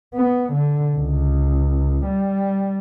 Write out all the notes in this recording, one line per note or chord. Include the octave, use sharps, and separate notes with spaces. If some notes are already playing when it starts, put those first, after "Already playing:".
B3
D3
C#2
G3